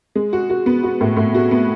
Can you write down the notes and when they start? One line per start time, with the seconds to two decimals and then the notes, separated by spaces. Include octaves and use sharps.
0.15 G#3
0.33 F#4
0.50 F#4
0.66 B3
0.83 F#4
1.01 A2
1.17 A2
1.35 F#4
1.51 B3